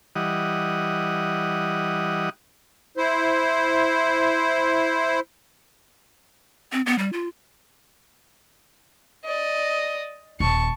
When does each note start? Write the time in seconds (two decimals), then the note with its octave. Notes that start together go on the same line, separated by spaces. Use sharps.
0.16 E3 G3 D#5 F#5
2.97 E4 C5
6.72 C4
6.86 B3
6.98 G3
7.13 F4
9.25 D5 D#5
10.40 D#1 A5 C#6